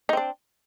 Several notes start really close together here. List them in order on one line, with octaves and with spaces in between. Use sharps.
D#4 C4 D4